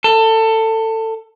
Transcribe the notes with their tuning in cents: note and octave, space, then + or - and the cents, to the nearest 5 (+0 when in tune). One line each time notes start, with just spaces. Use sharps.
A4 +20